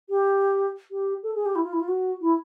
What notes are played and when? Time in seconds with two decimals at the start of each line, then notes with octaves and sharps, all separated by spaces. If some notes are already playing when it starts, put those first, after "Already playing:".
0.09 G4
0.91 G4
1.23 A4
1.35 G#4
1.46 G4
1.56 E4
1.64 F4
1.73 E4
1.80 F4
1.88 F#4
2.21 E4